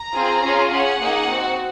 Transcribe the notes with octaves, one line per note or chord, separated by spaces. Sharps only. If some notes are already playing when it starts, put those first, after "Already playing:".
Already playing: A#5
C4 F4 G#4
C#4 F4 G#4
C#4 G#4 F#5
A#3 D#4 G#4
C4 F#4